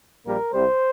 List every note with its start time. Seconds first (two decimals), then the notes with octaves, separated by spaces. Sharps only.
0.25 A#1 A#2 G3 A#3 A#4
0.53 C2 C3 G3 C5